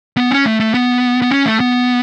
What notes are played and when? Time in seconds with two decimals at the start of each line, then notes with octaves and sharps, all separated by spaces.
0.17 B3
0.31 C#4
0.46 A3
0.60 A3
0.74 B3
1.22 B3
1.31 C#4
1.46 A3
1.60 B3